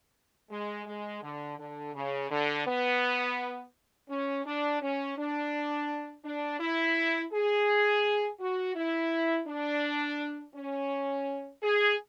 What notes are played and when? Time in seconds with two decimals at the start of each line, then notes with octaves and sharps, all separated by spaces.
0.51 G#3
0.87 G#3
1.23 D3
1.59 D3
1.94 C#3
2.31 D3
2.66 B3
4.09 C#4
4.46 D4
4.81 C#4
5.18 D4
6.25 D4
6.60 E4
7.33 G#4
8.40 F#4
8.76 E4
9.47 D4
10.55 C#4
11.63 G#4